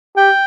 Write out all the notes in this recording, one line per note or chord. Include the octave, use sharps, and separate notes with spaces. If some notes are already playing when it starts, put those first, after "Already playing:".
G4 G5